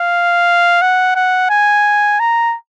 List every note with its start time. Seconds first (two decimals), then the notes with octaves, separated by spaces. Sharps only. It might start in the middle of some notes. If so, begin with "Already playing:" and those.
Already playing: F5
0.82 F#5
1.16 F#5
1.50 G#5
2.20 A#5